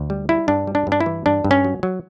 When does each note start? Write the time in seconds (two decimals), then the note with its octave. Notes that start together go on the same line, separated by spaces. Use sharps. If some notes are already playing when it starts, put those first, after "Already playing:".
Already playing: D2
0.10 G3
0.29 G3 E4
0.48 G2 D4
0.67 G3
0.75 D4
0.87 G2 D4
1.00 E4
1.06 E3
1.26 G2 D4
1.44 G2
1.51 C#4
1.64 F#3
1.83 F#3